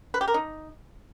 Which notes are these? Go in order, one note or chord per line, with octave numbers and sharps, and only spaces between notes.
B4
G4
A#4
D#4